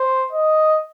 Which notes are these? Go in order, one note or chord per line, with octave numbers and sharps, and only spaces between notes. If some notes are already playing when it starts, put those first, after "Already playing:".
Already playing: C5
D#5